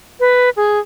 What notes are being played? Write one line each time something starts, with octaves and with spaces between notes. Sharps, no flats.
B4
G#4